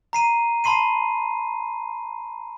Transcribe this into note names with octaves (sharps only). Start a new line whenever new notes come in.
A#5 C7 D#7
A5 B5 C6 C7 D#7